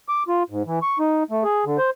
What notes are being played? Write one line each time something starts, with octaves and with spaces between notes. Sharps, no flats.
D6
F4
G#2
E3
C#6
D#4
A3
G#4
D3
C5